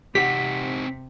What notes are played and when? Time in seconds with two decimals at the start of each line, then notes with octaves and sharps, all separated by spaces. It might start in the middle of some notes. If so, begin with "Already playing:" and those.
0.15 C3 C4 D#4 G4 F#5 B6